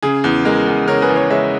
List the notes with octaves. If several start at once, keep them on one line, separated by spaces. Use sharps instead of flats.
C#3 G#4
E2
G#3 A#4
E2
C#3 A#4 C#5
G#4 B4
E2
A#4 C#5
G#3 C#5 E5